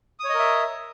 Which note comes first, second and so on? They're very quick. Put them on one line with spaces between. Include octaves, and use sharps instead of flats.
D#6 C#5 D#5 A#4 E5